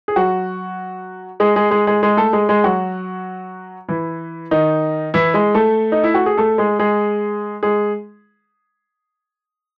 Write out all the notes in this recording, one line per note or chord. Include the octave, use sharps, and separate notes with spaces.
G#4
F#3 F#4
G#3 G#4
G#3 G#4
G#3 G#4
G#3 G#4
G#3 G#4
A3 A4
G#3 G#4
G#3 G#4
F#3 F#4
E3 E4
D#3 D#4
E3 E4
G#3 G#4
A3 A4
D#4
E4
F#4
G#4
A3 A4
G#3 G#4
G#3 G#4
G#3 G#4